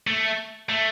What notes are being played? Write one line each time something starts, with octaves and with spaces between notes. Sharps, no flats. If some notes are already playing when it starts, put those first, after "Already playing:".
A3
A3